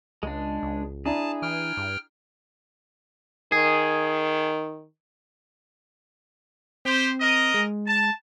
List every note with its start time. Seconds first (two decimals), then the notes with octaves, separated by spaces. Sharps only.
0.23 C#2 G#3 D4
0.63 C#2
1.05 D4 E4 G#4 A5 A#5
1.42 E3 G5 F6
1.77 G2
3.52 D#3 G#4
6.85 C4 G4 C5
7.20 A#4 D#5
7.54 G#3
7.87 A5